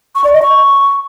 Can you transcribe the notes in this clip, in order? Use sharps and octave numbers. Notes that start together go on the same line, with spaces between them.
C#6
D5
D#5
C#6